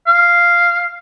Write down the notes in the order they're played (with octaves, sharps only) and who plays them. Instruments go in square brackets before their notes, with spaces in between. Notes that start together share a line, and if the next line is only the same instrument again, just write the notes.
[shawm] F5